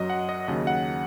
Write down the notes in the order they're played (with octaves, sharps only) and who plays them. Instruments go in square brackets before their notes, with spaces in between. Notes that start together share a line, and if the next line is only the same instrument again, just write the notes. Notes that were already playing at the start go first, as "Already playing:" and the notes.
Already playing: [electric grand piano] F#2 F#3 D#5
F#5
D#5
D#2 C#3 F#3 D#5
F#5